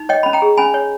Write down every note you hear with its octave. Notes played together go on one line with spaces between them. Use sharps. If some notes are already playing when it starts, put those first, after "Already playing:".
Already playing: D#4
C#5 D#5 G5
C#4 B5
G5 A#5
G#4
C#4 G#5 B5
C#5